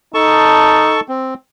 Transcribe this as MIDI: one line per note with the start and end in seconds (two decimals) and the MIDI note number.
0.14 0.99 63
0.14 1.00 69
0.14 1.00 81
0.14 1.00 85
1.08 1.34 60